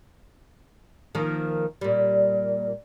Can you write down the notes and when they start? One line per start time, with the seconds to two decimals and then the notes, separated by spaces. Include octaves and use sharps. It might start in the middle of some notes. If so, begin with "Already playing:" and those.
1.15 D#3 F3 A#3
1.81 A#2 G3